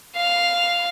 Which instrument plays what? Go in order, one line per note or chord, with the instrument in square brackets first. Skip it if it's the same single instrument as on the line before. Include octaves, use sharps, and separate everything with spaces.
[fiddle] F5